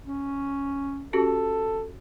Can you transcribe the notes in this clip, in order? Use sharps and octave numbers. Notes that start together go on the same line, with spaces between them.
C#4
C#4 F#4 G4 A4